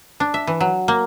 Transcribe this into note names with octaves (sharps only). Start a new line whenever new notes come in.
D4
E5
E3
F#3
A#3